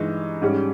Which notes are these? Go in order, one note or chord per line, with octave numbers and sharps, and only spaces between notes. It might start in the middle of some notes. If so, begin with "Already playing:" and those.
Already playing: G2 E3 G#3 D#4
G#2 G3 C#4